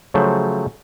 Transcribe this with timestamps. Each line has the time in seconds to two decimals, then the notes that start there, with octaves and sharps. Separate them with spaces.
0.14 C#3 F3 F#3 A3 C5